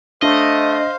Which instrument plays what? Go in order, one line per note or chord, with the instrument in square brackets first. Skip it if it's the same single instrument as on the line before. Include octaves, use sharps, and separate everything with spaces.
[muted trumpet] A3 [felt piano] D4 [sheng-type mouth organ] C5 F5 [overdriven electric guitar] D#5